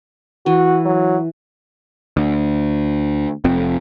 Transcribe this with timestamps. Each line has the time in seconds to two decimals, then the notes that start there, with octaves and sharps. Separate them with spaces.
0.46 E3 F#4
0.85 F#3
2.17 D2
3.44 F1 F2 C4